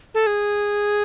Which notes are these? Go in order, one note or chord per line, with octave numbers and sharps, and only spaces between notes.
A4
G#4